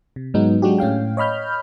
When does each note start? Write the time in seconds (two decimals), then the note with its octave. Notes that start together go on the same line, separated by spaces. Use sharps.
0.16 C3
0.34 G#2 F#3 G#3 B3 D#4
0.62 F#3 G#3 D4 F#4 G4
0.78 A2 C#4 F5 G5
1.17 C#5 D#5 B5 F6 G6